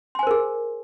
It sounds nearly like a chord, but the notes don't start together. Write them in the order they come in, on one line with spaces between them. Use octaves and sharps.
C6 G#5 C5 A#4 G#4